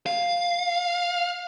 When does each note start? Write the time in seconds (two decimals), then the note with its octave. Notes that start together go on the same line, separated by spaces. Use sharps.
0.06 F5